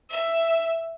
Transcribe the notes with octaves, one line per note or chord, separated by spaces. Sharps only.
E5